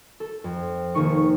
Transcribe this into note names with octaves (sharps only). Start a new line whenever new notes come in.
A4
F2
F1 F2 D#3 A#3 D#4 C#6